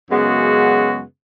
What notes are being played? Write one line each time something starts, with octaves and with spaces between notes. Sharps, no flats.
F#2 C#3 G#3 B3 F#4